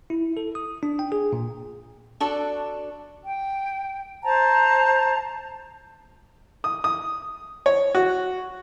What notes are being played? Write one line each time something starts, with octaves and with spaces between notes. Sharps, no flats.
E4
A4
D#6
D4
G5
G#4
A#2
D4 F#4 A4 D5
G5
C5 A5 A#5
D#6
D#6
C#5
F#4